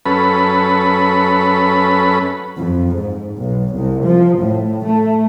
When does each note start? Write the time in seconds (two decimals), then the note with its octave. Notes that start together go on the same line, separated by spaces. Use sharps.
0.06 F#2 C#4 A4 B4 B5
2.58 F2
2.97 G#2
3.36 B1
3.75 C2
4.04 F3
4.40 A2
4.87 A3